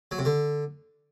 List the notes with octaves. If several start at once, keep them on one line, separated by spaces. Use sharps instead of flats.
F#3
C3
D3